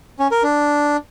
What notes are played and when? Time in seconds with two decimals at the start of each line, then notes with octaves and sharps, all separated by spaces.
0.19 C#4
0.31 A#4
0.43 D4